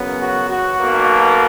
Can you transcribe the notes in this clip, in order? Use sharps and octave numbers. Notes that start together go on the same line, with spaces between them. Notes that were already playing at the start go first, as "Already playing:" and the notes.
Already playing: F#2 C#3 F#3 B3
F#4
F#4
B1 B2 A#3